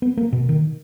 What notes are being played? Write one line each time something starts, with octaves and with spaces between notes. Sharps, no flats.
B3
A#3
B2
D#3